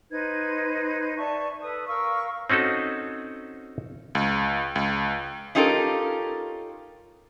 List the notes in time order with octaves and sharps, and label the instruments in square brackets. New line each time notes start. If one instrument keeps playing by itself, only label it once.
[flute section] D#4 B4 C5 G#6
D5 E5 A5 C#6
A4 B4 D#6
A#4 F5 C#6 E6
[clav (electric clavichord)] C4 C#4 D#4 F#4 A4
[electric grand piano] C#2
C#2
[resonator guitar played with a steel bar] C#4 D#4 F4 G4 A4 A#4